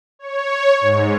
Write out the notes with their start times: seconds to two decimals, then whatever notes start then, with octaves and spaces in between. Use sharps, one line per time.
0.19 C#5
0.81 G#2